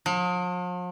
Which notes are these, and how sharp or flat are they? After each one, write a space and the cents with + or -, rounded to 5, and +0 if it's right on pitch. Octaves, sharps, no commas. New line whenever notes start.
F3 +45